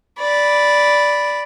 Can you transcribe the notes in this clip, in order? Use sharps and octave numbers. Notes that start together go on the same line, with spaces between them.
D5 B5